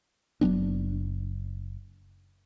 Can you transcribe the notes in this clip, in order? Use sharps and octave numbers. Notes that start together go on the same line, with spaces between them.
F#1 F#3 B3 D4